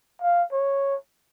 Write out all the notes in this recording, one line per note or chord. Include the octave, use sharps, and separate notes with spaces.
F5
C#5